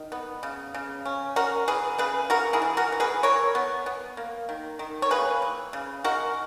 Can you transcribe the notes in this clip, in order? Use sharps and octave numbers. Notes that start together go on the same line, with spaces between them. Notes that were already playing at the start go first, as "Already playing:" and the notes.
Already playing: D#3
B3
C#3
C#3
C#4
C#4 F#4 A#4
E3 G#4 B4
C#3 G#4 B4
E3 F#4 A#4
E4 G#4
E3
F#4 A#4
E3
G#4 B4
E3 A#4 C#5
B3
B3
A#3
D#3
D#3
C#5
A#3 G#4 B4
E3
C#3
G#3 F#4 A#4